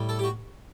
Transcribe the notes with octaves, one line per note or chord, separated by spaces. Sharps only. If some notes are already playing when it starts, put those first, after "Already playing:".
Already playing: A2 G3
A4
G4
F#4